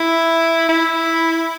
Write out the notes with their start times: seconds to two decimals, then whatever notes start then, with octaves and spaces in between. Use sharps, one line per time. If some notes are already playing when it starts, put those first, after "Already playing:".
Already playing: E4
0.69 E4